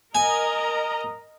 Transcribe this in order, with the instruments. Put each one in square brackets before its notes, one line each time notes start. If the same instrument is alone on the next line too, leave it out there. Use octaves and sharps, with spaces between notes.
[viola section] A#4 D#5 A#5 [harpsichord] G#5